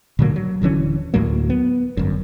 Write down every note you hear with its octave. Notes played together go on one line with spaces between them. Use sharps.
A#2 D3 F#3 A#3
F#3
D#1 D3 E3 C#4
D2 A2 F#3 A#3
B3
G1 F#2